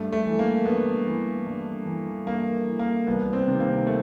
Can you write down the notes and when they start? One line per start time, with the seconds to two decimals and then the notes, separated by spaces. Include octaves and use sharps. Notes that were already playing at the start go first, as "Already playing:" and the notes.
Already playing: G2 A3
0.12 A3
0.26 E3
0.39 A#3
0.66 G2 B3
1.06 E3
1.46 G2
1.86 E3
2.26 G2 A#3
2.67 E3
2.79 A#3
3.07 C2 B3
3.33 C4
3.48 C3 D#3
3.60 A#3
3.87 A3